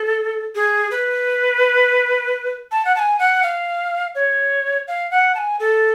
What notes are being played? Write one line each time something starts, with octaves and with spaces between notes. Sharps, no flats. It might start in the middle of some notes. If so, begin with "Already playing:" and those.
Already playing: A4
G#4
B4
A5
F#5
A5
G#5
F#5
F5
C#5
F5
F#5
A5
G#5
A4